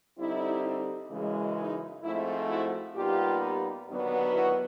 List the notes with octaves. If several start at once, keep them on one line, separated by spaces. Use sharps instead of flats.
D3 G3 C4 D#4 E4
F#2 C#3 E3 G#3
D#4
G#2 F3 A3 C4 E4
E4 F#4
A#2 G3 B3 D#4 F4 G4
D#2 D3 F#3 B3 D4
E4 F#4